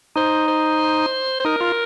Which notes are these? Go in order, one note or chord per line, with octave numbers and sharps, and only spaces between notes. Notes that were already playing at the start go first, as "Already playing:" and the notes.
D#4 C5
C5
C5
D#4 A#4
F4